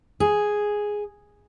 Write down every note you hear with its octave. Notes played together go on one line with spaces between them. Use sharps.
G#4